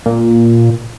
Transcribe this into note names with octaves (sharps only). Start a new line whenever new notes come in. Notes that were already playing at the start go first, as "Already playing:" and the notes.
A#2